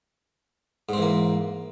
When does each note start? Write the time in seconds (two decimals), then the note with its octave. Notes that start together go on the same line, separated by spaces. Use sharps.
0.89 G#2
0.93 C4
0.98 E3
1.02 A#3